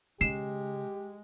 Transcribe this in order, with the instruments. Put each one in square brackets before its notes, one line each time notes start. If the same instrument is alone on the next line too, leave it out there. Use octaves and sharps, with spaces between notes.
[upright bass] C#3 [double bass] G#3 [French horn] G4 [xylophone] C7 E7